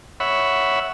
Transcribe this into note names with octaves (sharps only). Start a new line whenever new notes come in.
C#5 E5 F#5 B5